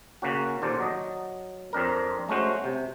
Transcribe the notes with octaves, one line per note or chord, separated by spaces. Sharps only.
C#3 A#3 C#4 F#4
D#2 A#2 A4 C5 D5
F#3 D#5
F2 C4 D4 A#4
G#3 A3 C#4 F#4 C5
C3